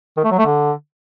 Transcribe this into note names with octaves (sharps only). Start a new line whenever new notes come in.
D#3
A3
F#3
A3
D3